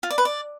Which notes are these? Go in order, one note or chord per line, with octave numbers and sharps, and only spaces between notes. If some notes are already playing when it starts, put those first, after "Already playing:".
F4
D5
B4
D5